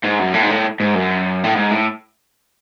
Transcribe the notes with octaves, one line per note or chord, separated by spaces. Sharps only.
G#2
F#2
A2
G#2
A2
G#2
F#2
A2
G#2
A2